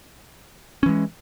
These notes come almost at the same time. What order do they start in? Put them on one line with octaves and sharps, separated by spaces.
C#4 E3 G#3